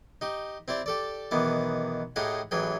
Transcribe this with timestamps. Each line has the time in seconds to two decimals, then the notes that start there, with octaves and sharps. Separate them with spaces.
0.21 D#4 G4
0.68 C4 E4 G4 D5
0.86 G4 A4 D5
1.31 B1 D#3 E3 B3 D6
2.16 A2 D#4 G4 G#4 F5 F#5
2.51 A1 E3 F#3 G#4 G5